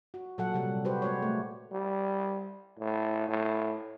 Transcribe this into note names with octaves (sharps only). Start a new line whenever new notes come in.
F#4
A#2 F#3 A4 F#5
C3 G3
F#4 G4 B4 C5
G#3 F#4 C#5
A3
G3
A2
A2